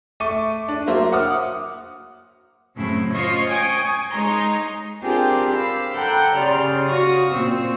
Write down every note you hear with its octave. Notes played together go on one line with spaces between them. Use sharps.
A3 C#6 D6 D#7
D4
F#3 A#3 C5 E5
F#5 D6 D#6 F6
F#2 A2 C#3 A3 C4 E4
F4 C5 C#5 D#5 C#6
G5 G#5 C#6 D#6 G#6
G#5
G#3 D#4 G#4 C#5 A#5 C6
C4 D4 F4 G4 G#4 A#4
F5 B5 D6 E6
A4 F#5 G5 A#5 B5 F#6
C#3 G4 D5 C6 F6
F#4 F5 C#6 D#6
A#2 C4 C#6 E6